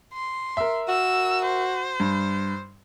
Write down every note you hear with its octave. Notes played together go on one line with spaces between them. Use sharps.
C6
A#4 E5
F#4 E6
C5
G2